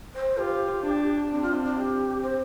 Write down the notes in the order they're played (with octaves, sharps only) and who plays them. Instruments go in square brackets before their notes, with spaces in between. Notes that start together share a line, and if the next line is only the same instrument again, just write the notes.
[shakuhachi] C5
[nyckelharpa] F4 [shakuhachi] G4
[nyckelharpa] D4
[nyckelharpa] C4 [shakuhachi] D4
[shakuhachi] F4
D4
D4
G4
C5